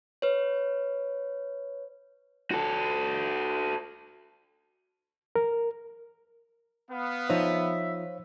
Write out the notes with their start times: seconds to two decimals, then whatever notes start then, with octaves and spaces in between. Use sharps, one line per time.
0.22 B4 C#5
2.51 F#4 A4
5.36 A#4
6.91 B3 F5
7.30 F3 D#4 C5 C#5 E5 F5